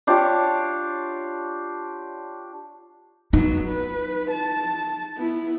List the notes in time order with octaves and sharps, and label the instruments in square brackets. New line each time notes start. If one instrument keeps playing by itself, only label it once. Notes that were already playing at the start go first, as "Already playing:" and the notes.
[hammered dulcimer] D4 F4 G4 C#5
[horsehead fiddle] F#3 B3 [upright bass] D#4
[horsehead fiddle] B4
A5
B3 E4